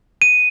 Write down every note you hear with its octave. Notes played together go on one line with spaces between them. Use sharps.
D#7